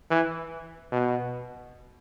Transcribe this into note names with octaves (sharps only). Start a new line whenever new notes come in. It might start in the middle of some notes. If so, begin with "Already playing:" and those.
E3
B2